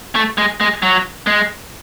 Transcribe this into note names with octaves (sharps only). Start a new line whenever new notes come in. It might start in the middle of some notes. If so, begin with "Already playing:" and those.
A3
G#3
G#3
F#3
G#3